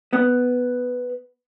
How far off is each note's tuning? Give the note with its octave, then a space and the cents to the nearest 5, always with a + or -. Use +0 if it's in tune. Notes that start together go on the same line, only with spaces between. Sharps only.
B3 +5